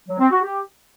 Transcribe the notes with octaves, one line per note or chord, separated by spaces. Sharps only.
F#3
C4
F#4
G4